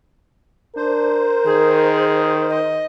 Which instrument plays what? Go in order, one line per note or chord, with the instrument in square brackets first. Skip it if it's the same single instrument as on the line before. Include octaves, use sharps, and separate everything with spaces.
[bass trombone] D4 [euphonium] A#4 [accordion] C5
[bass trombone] D#3 [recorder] G#4
[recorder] D#5